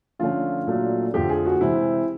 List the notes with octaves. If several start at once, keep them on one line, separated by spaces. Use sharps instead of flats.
D3 F3 A3 C#4 F4
A#2 F#3 A3 D4
F2 D3 F3 A3 G4
G#4
F#4
C3 E3 G#3 C4 E4